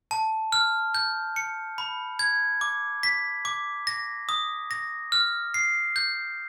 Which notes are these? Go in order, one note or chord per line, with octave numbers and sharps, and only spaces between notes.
A5
F6
G6
C#7
B5
G#6
D6
B6
D6
A#6
D#6
A#6
F6
C7
G6